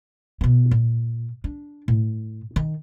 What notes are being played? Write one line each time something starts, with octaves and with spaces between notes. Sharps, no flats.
B2 B3
A#2
D4
A2
D#3